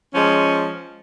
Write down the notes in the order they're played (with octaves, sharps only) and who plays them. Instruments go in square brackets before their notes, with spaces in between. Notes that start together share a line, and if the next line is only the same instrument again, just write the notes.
[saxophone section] F3 G#3 C#4